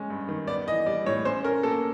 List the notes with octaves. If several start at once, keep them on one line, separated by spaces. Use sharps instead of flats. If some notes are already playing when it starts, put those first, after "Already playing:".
Already playing: G#3 C#4
G2
D#3
B3 D5
E3 D#5
G3 D5
A2 C#5
C#4 C5
C#4 A#4
A#3 A4